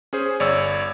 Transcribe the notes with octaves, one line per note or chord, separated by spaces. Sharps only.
C#4 G#4 C5
G1 C#5 D5 E6